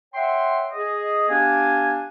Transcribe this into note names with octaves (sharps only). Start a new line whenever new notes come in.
C#5 E5 F#5 G5 C6
G#4 D#5
B3 D4 G4 F5 G#5